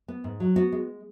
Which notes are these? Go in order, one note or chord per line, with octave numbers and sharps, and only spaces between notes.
B3
G#2
F#3
B3 F#4
G#3